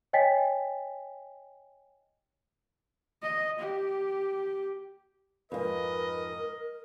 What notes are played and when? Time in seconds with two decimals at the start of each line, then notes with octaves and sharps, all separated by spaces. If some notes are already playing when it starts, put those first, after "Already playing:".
0.13 C#5 D#5 G5 G#5 A6 B6
3.22 D#5
3.59 G4
5.52 F2 G#2 A#4 B4 D#5